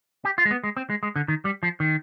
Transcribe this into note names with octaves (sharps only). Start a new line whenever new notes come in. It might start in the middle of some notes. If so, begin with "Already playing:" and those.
G4
F4
G#3
B3
G#3
C4
G#3
G#3
D3
D#3
G3
F3
D#3